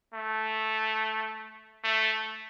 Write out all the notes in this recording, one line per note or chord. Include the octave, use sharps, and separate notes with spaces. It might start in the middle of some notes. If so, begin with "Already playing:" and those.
A3
A3